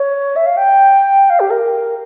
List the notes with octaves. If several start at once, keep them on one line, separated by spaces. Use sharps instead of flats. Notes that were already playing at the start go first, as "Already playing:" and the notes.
Already playing: C#5
E5
F5
G5
F5
G4
A#4